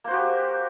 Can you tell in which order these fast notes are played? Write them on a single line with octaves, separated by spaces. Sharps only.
A#3 C5 F#4 G4